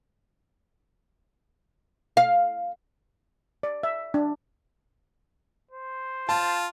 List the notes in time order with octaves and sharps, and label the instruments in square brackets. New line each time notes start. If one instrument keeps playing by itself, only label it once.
[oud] F5
[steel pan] D5
E5
D4
[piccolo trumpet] C5
[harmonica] F4 [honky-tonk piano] A5